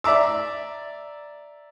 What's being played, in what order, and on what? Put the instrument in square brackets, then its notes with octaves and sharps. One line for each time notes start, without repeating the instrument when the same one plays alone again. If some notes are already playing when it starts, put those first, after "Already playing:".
[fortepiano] D5 E5 A#5 D6 E6